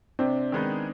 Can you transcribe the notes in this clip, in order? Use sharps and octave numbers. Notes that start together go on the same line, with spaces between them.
C3 C4 D4
D#3 G#3 B3 D#4